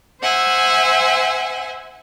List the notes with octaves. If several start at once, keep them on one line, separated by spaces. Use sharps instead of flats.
C5 E5 F#5 G#5